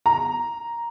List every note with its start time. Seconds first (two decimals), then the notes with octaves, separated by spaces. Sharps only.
0.06 A#5